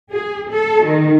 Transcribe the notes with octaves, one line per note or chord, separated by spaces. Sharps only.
G#4
A4
D#3